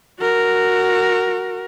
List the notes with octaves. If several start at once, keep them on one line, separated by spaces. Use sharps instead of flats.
F#4 A#4